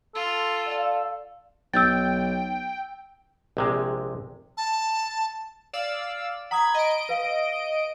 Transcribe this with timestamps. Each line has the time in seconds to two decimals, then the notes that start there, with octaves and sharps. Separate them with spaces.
0.15 F4 A4
0.68 D5 F5
1.73 B1 G5 E6 G6 A6
3.57 A#1 C3 G#3
4.57 A5
5.73 D5 F5 E6
6.51 F#5 A#5 B5 D#6 G#6
6.75 D#5 D7
7.09 B4 F5